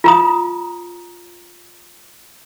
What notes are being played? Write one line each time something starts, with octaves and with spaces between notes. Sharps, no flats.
F4 A#5 D#6